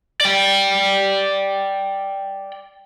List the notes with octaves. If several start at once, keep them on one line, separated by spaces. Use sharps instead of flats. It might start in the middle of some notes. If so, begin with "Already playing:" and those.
D5 G5